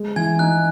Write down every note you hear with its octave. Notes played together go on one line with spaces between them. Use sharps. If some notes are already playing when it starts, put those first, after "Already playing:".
Already playing: G#3
E3 G#5 G#6
D#4 F#6